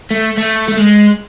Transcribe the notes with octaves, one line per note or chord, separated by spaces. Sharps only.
A3
A3
A3
G#3